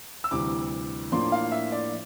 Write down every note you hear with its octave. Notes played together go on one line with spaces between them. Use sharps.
E6
D2 C3 E3 G3 D6
A2 F3 A#3 D4 C6
F5
E5
D5